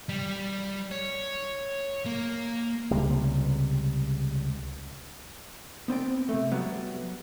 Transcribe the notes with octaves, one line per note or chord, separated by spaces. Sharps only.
G3
C#5
A#3
C#2 C3 G3
B3 C4 D5 G5
C3 A3
F#3 G3 B3